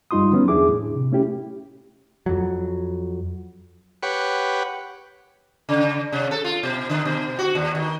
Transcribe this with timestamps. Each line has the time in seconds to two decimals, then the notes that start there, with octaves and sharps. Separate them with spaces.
0.11 G2 G3 D#4 F4 C6 D#6
0.31 D3 F#3 B3 C#4
0.48 E2 D4 E4 G#4 D6
0.68 A2
0.96 C3
1.12 A3 C#4 E4 G4
2.26 F2 F#3
4.03 G4 B4 C#5 F#5
5.69 C#3
6.12 C3
6.31 A4
6.44 F4
6.63 B2
6.89 D3
7.05 B2
7.39 F#4
7.55 D#2
7.75 D#3